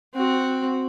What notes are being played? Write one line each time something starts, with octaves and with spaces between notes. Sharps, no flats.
C4 F#4